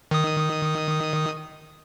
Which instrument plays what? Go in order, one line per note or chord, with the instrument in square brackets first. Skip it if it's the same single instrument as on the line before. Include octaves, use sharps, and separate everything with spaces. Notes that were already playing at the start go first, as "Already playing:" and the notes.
[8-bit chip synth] D#3 D#6